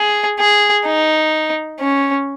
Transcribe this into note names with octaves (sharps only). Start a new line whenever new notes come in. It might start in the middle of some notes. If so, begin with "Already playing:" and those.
Already playing: G#4
G#4
D#4
C#4